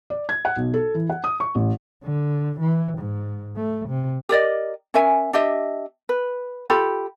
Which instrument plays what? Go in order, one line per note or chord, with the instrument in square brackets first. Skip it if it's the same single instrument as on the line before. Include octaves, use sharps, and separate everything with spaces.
[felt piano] D5
G#6
F#5
B1
A4
E3
F#5
D#6
C#6
A1
[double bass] D3
E3
G#2
A3
C3
[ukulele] G4 A#4 D5 D#5
C#4 A#4 E5 G#5
D4 G4 D#5 E5
B4
F4 G4 A4 B5